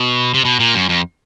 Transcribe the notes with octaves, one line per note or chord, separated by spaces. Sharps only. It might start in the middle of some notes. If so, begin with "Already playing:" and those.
Already playing: B2
C3
B2
A#2
F#2
F2